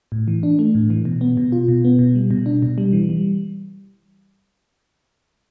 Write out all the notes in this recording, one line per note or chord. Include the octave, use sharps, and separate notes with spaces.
A2
E3
D4
A3
A2
E3
B2
B3
B2
F4
B2
B3
B2
G3
B2
D4
B2
G3
E3
G3